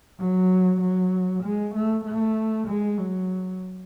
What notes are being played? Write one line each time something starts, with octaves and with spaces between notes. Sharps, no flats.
F#3
F#3
G#3
A3
A3
G#3
F#3